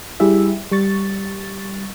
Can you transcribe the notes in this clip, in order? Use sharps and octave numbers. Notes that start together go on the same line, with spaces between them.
G3 E4 G4 G#4 E5
G3 C#6 A6